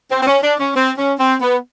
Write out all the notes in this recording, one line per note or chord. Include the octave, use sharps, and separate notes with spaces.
C4
C4
C#4
D4
C#4
C4
C#4
C4
B3